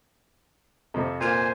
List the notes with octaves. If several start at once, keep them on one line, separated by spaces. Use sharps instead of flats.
F2 C3
A#2 C5 G#5